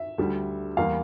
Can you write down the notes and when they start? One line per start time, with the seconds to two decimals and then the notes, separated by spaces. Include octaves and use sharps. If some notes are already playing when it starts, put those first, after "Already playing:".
Already playing: E5
0.18 D2 D3 G3
0.77 E2 E3 G3 A#3 F5